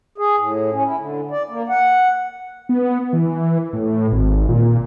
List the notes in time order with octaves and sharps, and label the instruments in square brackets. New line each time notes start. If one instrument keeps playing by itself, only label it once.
[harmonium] G#4
A2
C#4
E4
D3
D5
A#3
F#5
[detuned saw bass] B3
E3
A2
G#1
A#2